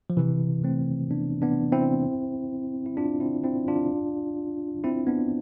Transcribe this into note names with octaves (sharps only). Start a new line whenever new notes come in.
F3
C3 E3
A3 C4
B3 D4
B3 D4
C4 E4
E4
D4 F4
C4 E4
C4 E4
D4 F4
C4 E4
B3 D4